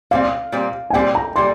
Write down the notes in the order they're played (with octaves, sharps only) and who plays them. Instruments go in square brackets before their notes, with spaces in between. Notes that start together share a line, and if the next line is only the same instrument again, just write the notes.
[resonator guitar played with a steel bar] A#2 G3 C4 [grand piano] F5
[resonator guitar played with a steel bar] A#2 G3 C4
[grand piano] G#5
[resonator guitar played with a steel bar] A#2 G3 C4 [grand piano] G5
[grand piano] A#5
[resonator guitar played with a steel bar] A#2 G3 [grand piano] C6